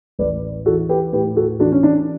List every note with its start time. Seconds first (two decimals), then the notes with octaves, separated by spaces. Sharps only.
0.19 A1 B4 D5
0.66 E3 F#4 A4
0.89 G4 B4
1.13 A2 G4 B4
1.36 F#4 A4
1.59 E3 D4 F#4
1.72 C#4
1.83 D4